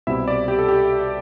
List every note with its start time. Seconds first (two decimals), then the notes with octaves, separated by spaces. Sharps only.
0.07 C2 B2 G3 C4 E4 E5
0.28 D5
0.48 G4
0.59 A4
0.68 G4